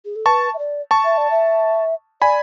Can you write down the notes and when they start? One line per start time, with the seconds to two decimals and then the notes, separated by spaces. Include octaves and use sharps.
0.05 G#4
0.16 A4
0.26 B4 A5 C#6
0.54 E5
0.58 D5
0.91 A5 C#6
1.04 E5
1.17 D5
1.31 E5
2.21 D5 G#5 B5